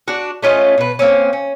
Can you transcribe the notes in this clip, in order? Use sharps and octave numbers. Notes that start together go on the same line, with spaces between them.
D4 F#4
A3 C#4 F4 D#5
B2 B4
A#3 C4 C#4
C#4